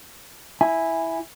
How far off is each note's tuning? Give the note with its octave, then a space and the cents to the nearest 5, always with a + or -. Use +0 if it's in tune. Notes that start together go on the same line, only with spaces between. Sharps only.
E4 +0 G#5 +0